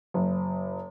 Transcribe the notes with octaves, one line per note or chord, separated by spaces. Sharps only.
F#1